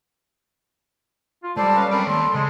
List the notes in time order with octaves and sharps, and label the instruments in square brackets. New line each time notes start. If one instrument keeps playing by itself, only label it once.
[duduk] F4
[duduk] G3 [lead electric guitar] G#3 [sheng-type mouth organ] A4 C5 D5 [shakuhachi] A5
[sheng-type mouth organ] C#4 B4 F5
[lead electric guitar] F#3 G5 [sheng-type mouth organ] C4 C#4 A#4 [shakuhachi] B5
[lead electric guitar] D#2 [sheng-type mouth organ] A4 [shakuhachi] C6
[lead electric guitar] C#3 [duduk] G#3